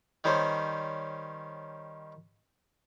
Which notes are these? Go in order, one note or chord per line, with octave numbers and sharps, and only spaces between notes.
D#3 G3 C#4 C5